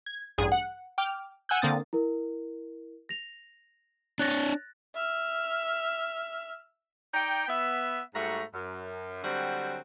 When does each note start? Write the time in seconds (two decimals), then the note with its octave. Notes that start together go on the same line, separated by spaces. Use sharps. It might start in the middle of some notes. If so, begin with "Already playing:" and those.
0.06 G#6
0.38 A1 G2 G#4
0.52 F#5
0.98 G5 D6 F6
1.49 F#5 G#5 E6 F#6 G6
1.62 D3 A#3 C4 D#6 A6
1.93 E4 A#4
3.09 A#6 F7
4.19 D4 C#5 F#6 A6 A#6
4.95 E5 F6
7.14 D#4 D5 G5
7.48 B3 E5
8.14 G#2 G3 A3 F#4 A#5
8.54 F#2
9.24 D3 F#3 G3 C4 F#4